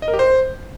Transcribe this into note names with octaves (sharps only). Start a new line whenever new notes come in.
D#5
A#4
G4
C5